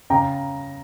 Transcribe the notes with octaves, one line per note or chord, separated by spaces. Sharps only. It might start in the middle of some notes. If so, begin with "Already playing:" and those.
C#3 G5 A#5